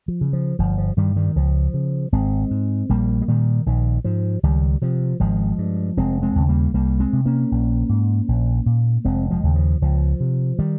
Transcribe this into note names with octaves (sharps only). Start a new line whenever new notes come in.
F3
C#3
F3
G1 F3
F3
G2 D#3 G3
D#3 G3
C#2 F3
C#3
G#1 G#3 C4
G#2
A#1 G3 A#3
G#3
A#2 D#3 G3
A#1 D#3
G#2 F3
C#2 D#3 G3
C3 F3
G#1 F3 G#3
G2
F1 G#3 C4
G#3 C4
D#2 C#3
G3 A#3
C2 G3 A#3
G#3 C4
C3
A#3 C#4
A#1
G#2
A#1
A#2
F1 G#3 C4
F3 G#3
D#2 C#3
F3
C#2 F3
C3
D#3 G3